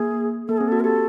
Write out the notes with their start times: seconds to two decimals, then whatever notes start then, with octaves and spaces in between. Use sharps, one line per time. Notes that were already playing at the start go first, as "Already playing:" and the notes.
Already playing: A#3 G#4
0.48 A#3 A4
0.57 C4 G#4
0.68 F#4 A4
0.80 A#4
0.84 G4 A4